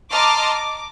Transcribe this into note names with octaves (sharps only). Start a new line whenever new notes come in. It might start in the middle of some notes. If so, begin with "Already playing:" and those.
D#5 A5 A#5 C6 D6 F6
D6